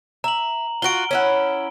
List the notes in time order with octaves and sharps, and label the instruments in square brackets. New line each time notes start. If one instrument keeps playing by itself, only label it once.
[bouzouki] E5 [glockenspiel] A#5 F#7
[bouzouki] F4 F#4 [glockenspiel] D7 G7
[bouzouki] C#4 E4 F#5